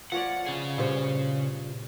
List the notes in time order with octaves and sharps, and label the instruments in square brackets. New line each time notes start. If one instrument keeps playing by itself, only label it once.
[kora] F3 C#5 D5 [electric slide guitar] F#5
[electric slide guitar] C#3 G#4
[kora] G2 C5 [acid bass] A#2